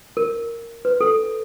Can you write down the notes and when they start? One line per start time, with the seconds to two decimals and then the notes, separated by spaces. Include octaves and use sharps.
0.17 A#4
0.85 B4
1.01 A4